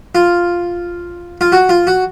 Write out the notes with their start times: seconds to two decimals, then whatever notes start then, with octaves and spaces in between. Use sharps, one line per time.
0.15 F4
1.41 F4
1.52 F#4
1.69 F4
1.87 F#4